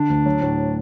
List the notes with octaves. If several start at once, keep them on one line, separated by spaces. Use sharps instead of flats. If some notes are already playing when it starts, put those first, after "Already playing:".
Already playing: D3 D4
D2
F#3
A2